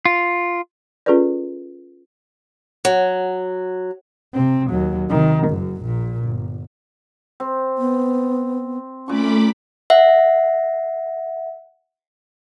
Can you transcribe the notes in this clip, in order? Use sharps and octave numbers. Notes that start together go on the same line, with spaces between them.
F4
C#4 F4 G#4 A4 B4 D5
F#3
C3 C4
D#2 F#3
C3 D#3
F#1 F#2
A#1 A#2
G1
C4
B3
A#2 A3 C#4 B5 C#6 D6
E5 F#5